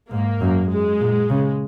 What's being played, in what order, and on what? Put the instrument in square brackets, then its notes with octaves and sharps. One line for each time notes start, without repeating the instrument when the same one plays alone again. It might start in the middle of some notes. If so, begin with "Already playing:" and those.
[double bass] G#2 [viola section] A#3
[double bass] F#2
[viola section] G#3
[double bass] A#2
C#3